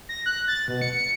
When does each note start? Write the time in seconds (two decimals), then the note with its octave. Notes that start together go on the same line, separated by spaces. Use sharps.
0.09 A#6
0.26 F#6
0.48 A6
0.68 B2
0.82 C#7
0.94 C#7